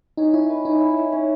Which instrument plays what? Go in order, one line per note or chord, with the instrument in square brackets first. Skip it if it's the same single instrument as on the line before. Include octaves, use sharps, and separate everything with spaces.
[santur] C#4 [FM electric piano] D#4
[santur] C#4 [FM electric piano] E4
[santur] B4
[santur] C#4 [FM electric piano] D#4
[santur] E4
E4
C#4